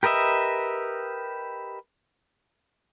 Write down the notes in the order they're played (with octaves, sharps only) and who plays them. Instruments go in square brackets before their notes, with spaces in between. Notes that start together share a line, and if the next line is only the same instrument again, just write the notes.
[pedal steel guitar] G4 A#4 B4 D#5 E5